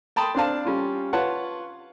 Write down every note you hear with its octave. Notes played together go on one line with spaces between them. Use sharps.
G5 A5 B5 C6 D#6
C4 D4 F5 A5
G3 C#4 F4
F4 B4 C#5 F#5 A5